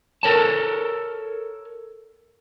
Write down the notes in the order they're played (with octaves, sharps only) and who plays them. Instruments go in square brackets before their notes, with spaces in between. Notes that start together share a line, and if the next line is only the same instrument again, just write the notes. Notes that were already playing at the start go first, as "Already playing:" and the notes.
[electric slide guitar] A4 A#4 C#5 A5